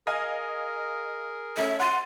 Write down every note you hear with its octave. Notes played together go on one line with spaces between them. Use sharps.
G#4 A#4 D#5 F5 G#5
A3 C#4 E5
F#5 C6 A6 D#7